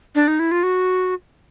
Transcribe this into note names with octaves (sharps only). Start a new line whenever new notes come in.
D4
D#4
E4
F4
F#4